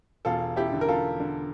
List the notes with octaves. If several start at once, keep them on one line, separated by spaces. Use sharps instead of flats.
E1 F4 A4
E4 G4
D3
A#4
F4 A4
D3